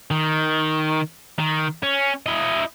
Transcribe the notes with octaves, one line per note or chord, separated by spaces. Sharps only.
D#3
D#3
C#4
E4 D#5